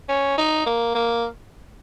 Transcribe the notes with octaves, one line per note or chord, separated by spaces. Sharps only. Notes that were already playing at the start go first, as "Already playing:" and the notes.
C#4
D#4
A#3
A#3